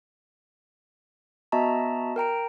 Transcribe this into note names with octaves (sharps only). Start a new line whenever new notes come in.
B3 F#4 D#5 E5 A5 A#5
A#4 G5 A#5 D7